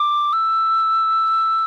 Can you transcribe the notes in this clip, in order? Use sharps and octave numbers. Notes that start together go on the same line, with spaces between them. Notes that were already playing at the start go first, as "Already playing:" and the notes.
Already playing: D6
E6